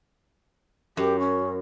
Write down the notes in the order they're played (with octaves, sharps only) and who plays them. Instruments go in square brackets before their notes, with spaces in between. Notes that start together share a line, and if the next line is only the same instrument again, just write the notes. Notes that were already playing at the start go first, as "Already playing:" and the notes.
[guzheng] F#2 [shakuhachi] G4
[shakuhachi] C#4